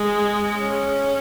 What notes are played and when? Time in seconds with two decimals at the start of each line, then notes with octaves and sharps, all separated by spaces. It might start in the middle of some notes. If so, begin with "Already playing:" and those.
Already playing: G#3
0.59 C#4